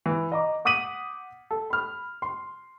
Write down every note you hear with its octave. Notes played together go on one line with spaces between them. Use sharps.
E3
D#5 A#5 D6
F#5 D6 D#6 B6 D#7 F#7
A4
B5 F6
C6